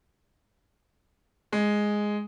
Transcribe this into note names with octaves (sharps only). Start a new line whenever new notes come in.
G#3